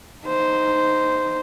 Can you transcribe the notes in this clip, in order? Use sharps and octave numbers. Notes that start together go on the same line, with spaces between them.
D#4 C5